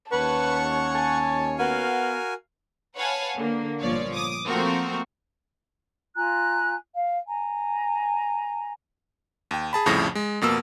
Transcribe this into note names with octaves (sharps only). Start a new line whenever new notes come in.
D#2 C#4 B4 C#5 F#5 A5 C#6
G#5 A5
B3 F#4 A#4 F5 G#5
B4 C#5 F5 F#5 G#5 A5
D3 A#3
G1 A#2 F3 C#5 D5
D6 D#6
F3 A3 A#3 C4 F#4 A#4
F4 G#5 A#5 F#6
F5
G#5 A#5
D#2 G5
G#4 A5 B5
C2 F2 A2 C#3 F3 A#6
G#3
F2 B2 A#3 E6